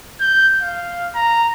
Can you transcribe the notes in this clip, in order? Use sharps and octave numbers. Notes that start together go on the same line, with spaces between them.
G6
F5
A#5